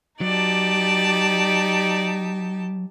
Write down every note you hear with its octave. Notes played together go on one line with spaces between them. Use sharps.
F#3 D#4 G4 D5 A5